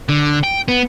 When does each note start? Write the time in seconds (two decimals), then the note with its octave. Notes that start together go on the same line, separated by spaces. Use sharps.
0.09 D3
0.44 G5
0.68 B3